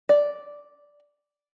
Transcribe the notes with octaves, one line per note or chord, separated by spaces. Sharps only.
D5